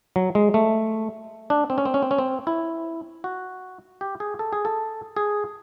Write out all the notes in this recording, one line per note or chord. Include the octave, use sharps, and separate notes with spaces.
F#3
G#3
A3
D4
C4
C#4
C4
C#4
C4
C#4
C4
E4
F#4
G4
G#4
A4
G#4
A4
G#4